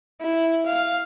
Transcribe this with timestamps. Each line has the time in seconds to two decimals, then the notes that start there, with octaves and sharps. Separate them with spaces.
0.21 E4
0.66 F5